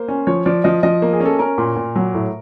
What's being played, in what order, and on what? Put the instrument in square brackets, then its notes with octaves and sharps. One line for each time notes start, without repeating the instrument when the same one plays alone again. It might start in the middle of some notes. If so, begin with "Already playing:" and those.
Already playing: [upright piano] A#3 C5
C#4
F3 C#5
F3 D5
F3 D#5
F3 D#5
A#3
G#4
C#4
A4
C#4 A#4
A#2
A#2
F#3
A2